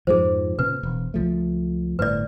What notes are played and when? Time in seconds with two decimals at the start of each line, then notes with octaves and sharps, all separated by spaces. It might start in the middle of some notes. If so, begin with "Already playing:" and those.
0.07 F2 G#2 F3 G#4 C5
0.59 A#2 C#3 B4
0.83 E1
1.14 C#2 F3 A3
1.99 G1 A2 B4 D5